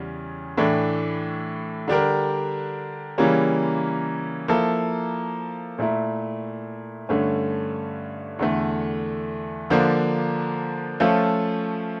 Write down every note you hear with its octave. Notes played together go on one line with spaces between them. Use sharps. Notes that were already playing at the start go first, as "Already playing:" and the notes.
Already playing: E2 C#3 G3 C#4
A2 E3 A3 D4
D3 G3 D4 G4 A#4
C#3 E3 G3 A#3 C#4
F3 A#3 E4 A4
A#2 A3 E4
G2 D3 A3 C#4
E2 D3 A3
D3 F3 A#3 D4
F3 A3 C#4 F4 A4